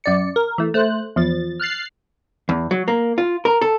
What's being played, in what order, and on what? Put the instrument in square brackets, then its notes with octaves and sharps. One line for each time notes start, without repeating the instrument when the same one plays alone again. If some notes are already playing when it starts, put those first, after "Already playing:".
[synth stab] F#2 D5 C#7
A#4
E3 A3
A3 C5 F#6
E2 F3 A6
F6 F#6 A6 C7
[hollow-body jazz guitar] E2
F#3
A#3
F4
A#4
A4